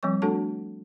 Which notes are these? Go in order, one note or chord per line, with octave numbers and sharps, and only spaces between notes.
F3 G3 C4 C#5 C#6
A3 D4 F#4 A4 A5